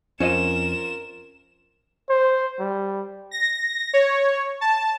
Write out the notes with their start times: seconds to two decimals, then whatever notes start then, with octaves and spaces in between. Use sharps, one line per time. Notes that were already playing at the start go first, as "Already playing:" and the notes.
0.20 F2 C#4 F4 A#4 C5 D#5 E7
2.09 C5
2.59 G3
3.31 A#6
3.93 C#5
4.61 A5